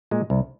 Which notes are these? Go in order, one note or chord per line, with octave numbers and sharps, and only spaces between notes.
A#2 G#3
C2